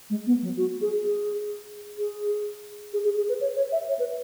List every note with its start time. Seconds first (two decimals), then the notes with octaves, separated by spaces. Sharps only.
0.10 G#3
0.26 B3
0.42 F#3
0.57 F#4
0.81 G#4
1.04 G#4
1.98 G#4
2.93 G#4
3.04 G#4
3.17 G#4
3.29 B4
3.41 C#5
3.56 C#5
3.72 E5
3.88 C#5
3.99 B4